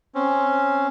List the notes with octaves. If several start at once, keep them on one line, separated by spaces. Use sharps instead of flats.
C4 C#4